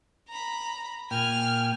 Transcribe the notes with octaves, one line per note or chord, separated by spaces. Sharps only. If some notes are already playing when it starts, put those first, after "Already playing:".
A#5 B5
A#2 G5 G#5 F6